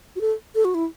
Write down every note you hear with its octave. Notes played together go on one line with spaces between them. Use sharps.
F#4
A4
A4
F#4
E4